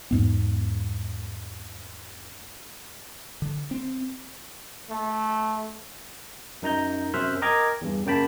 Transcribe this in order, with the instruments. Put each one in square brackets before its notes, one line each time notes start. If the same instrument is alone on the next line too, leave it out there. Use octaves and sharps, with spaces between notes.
[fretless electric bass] E2 G#2 B3
[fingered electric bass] D3
C4
[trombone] A3
[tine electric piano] F#2 D#4 A#5 G6
F#2 C3 C5 E5 F6 F#6
A#4 D#5 G5 A#5 D6 G#6
E2 G2
F#2 C#3 A#3 G5 A5 B5